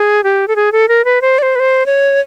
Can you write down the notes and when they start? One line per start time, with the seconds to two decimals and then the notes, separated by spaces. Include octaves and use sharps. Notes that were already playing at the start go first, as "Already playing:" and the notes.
Already playing: G#4
0.24 G4
0.48 A4
0.56 G#4
0.72 A4
0.88 A#4
1.05 B4
1.21 C5
1.38 D5
1.43 C5
1.55 B4
1.60 C5
1.86 C#5